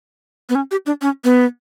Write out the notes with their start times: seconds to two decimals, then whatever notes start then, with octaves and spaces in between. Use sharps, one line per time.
0.49 B3
0.55 C#4
0.71 G4
0.86 D4
1.02 C#4
1.24 B3